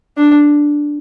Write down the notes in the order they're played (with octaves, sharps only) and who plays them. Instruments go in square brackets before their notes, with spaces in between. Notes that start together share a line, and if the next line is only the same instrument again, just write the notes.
[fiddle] D4